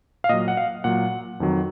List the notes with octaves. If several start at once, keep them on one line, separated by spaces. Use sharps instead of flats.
F5
A#2 F#3 D#5
F#5
F5
A#2 F#3 F#5
F2 D#3 F#3